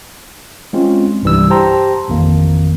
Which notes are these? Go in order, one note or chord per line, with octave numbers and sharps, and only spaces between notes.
G#3 C4 C#4 F4
C2 G2 E3 G3 E6
G4 C5 G5 A5 A#5 C6
A1 F2 D#3 A#3